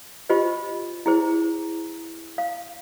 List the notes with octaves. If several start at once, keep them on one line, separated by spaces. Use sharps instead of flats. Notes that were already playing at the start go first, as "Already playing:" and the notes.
F4 G4 C5 D#5
E4 G#4 C5
F5